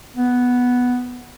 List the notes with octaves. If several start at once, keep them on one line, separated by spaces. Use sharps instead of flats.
B3